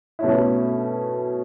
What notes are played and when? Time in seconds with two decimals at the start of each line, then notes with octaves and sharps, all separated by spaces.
0.19 B2 A3 C#4 E4